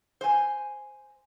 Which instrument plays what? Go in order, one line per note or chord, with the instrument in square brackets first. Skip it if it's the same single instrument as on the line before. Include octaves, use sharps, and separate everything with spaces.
[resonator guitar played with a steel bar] C5 G#5